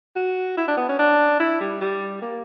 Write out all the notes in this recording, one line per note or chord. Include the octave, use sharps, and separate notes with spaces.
F#4
E4
D4
B3
C#4
D4
E4
G3
G3
A#3